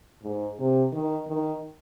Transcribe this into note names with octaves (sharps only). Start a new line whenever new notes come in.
G#2
C3
D#3
D#3